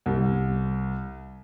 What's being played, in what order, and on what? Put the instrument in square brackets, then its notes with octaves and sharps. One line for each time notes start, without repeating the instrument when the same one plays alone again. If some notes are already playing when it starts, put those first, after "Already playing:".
[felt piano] C2